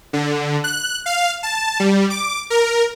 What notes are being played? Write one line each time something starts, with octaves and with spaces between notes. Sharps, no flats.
D3
F#6
F5
A5
G3
D6
A#4